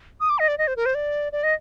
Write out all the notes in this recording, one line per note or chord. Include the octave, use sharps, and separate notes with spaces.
D#6
D6
D#5
D5
D#5
C5
A#4
C5
D5
D5
D#5